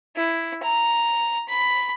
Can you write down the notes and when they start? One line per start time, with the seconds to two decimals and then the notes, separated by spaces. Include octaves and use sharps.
0.17 E4
0.63 A#5
1.49 B5